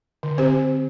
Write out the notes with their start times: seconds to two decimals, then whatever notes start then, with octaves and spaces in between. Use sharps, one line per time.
0.23 D3
0.38 C4 G4 C5